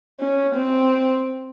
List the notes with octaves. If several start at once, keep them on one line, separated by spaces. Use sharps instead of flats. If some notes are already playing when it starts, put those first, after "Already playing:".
C#4
C4